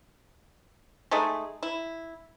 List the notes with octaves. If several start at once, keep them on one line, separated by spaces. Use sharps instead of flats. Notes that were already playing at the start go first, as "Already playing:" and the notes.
G#3 A3 D#4 G#4
E4